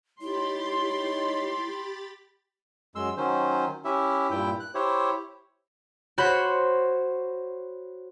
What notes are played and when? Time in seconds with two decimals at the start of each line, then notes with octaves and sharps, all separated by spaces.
0.21 D#4 E4 G4 C#5 B5 C6 A6
2.95 F#2 G#3 C6 E6
3.17 D#3 F#3 C#4 C5
3.85 C#4 E4 G4 E5
4.31 G2 A#2 E4 G5
4.60 F#6
4.75 E4 G4 C5 C#5
6.18 F#4 C5 C#5 B5